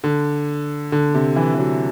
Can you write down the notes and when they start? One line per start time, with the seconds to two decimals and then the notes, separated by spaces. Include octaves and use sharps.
0.04 D3
0.92 D3
1.14 C3
1.36 E3
1.54 E3
1.58 F#3